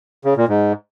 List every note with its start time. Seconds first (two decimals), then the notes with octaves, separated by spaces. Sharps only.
0.25 C#3
0.37 A#2
0.48 G#2